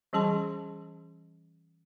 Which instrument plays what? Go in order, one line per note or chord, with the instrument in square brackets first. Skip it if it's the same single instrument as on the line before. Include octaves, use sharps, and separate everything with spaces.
[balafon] E3 G3 C#4 G#4 A5 C6